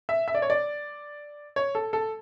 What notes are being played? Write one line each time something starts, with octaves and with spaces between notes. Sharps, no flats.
E5
E5
D5
C#5
D5
C#5
A4
A4